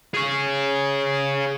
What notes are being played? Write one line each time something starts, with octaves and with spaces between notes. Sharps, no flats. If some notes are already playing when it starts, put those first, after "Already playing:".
G#4 C#5